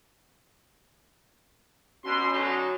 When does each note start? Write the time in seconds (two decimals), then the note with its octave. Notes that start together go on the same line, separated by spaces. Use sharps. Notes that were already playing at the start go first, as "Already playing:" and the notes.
2.05 B2 C#4 F#4 C6
2.33 D3 F#3 D#4